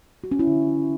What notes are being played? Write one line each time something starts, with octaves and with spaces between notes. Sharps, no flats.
F#4
C#4
E4
D3